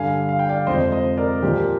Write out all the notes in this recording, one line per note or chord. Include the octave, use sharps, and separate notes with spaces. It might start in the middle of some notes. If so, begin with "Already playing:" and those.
Already playing: G2 D3 G3 F5 G#5
F5
G5
D5 F5
F2 C3 F3 G#3 C5 D#5
C5 D#5
A#4 D5
A#2 F3 A#3 G4 A#4